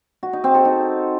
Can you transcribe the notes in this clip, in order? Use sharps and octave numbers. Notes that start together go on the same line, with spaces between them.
F#4
D#4
C4
A4
D#4